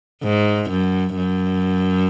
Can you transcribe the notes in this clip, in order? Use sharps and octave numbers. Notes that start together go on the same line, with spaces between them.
G#2
F#2
F#2